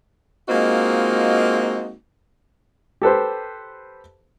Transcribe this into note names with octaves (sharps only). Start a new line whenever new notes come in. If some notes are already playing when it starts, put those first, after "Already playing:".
G#3 A#3 C4 D#4 F4 F#4
G4 A4 B4 C5